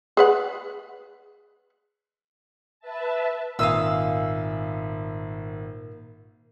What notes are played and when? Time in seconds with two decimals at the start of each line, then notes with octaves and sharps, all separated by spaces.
0.17 G#4 B4 F#5
2.80 B4 E5 A5
3.59 G#1 A#2 A#4 E5 F5 G#5 D#6 E6